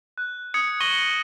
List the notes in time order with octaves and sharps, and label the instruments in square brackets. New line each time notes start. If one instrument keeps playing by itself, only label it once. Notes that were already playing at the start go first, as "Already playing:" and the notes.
[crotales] F#6
D#6 G#6 C#7
C#6 A#6 D#7 F#7 G7